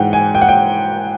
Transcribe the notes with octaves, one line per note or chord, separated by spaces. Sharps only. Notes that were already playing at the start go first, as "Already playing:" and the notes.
Already playing: G#2 E3 F#5 G5
G#5
G5
F#5
G5